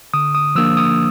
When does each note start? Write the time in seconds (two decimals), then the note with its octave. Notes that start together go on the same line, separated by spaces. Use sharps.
0.14 D3 D#6
0.35 D#6
0.55 F3 A#3 D4 E6
0.77 D#6